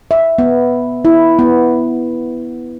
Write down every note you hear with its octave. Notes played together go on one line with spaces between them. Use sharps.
E5
B3
E4
B3